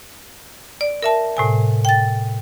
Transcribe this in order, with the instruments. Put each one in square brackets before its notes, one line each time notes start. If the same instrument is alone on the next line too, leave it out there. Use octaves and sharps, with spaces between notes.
[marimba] D5
A#4 E5 A5
A2 C3 G#5
G5 A6